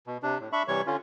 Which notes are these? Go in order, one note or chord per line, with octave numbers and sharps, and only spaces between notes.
B2
C3 D4
A2
D4 E5 B5 C#6
C3 E3 G3 C#5 C#6
D3 C#4 F4